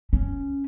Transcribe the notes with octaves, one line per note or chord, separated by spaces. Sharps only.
C#4